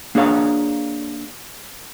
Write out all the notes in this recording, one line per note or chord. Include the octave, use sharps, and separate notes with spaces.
A#3 D4 G#4 C#5 F5